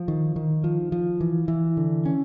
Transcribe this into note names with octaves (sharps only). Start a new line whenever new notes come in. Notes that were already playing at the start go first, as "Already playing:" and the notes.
Already playing: F3
D#3
D#3
F3
F3
E3
E3
D3
C#4